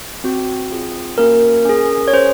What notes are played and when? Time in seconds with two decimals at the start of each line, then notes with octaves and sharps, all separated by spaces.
0.24 C4 F#4
0.70 C4 F4 G#4
1.18 A#3 C#4 F#4 A#4
1.65 C#4 G#4
2.08 C#5
2.13 C#4 G#4 C5